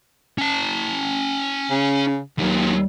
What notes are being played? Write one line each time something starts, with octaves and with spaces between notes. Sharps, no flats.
C#4 A5
C#3
D#2 A#2 F#3